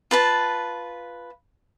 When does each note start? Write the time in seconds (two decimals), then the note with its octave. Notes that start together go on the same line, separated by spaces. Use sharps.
0.11 F4 B4 A5